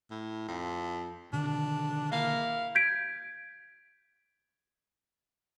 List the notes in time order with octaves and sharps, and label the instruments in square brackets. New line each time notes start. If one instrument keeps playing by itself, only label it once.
[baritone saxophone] A2
F2
[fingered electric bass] B2 D3 D#3 [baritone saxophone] D4
[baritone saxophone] A#3 [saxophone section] E4 F5
[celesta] G6 G#6 B6 D7